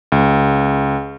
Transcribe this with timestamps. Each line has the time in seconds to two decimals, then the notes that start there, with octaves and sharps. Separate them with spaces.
0.12 C#2